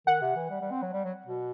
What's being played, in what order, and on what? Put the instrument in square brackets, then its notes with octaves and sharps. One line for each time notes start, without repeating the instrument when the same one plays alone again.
[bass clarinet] D#3 [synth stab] F#5
[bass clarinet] C3
E3
G3
G3
C4
F#3
G3
F#3
B2